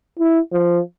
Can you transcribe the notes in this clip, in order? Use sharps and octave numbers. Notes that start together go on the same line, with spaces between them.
E4
F3